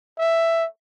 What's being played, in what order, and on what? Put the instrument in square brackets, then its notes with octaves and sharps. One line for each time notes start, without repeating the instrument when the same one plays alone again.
[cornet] E5